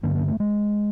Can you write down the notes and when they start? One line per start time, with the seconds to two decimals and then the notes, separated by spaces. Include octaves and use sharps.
0.03 G2 D3 A#3
0.15 A#3
0.28 A3
0.40 G#3